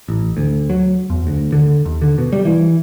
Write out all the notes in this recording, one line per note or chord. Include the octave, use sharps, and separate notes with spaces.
A1
D2
F#3
E2
D2
D3
D#2
D3
B2
G3
E3